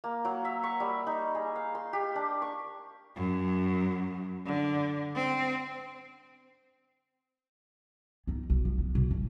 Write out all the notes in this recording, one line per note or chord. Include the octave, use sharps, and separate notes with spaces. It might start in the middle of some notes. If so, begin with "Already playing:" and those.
A#3
F#3
E5
C#6
G3
D#4
G#4
F5
C6
G4
D4
C#6
F#2
D3
C4
B3 D#4
B1
F3
B3
B1
G1